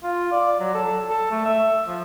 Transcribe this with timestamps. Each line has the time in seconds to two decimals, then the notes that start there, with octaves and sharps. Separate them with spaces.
0.03 F4
0.32 D5
0.60 F#3
0.74 A4
1.10 A4
1.31 A3
1.45 E5
1.87 F3